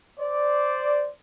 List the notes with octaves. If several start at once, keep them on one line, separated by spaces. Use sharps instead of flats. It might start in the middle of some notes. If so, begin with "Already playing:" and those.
C5 D5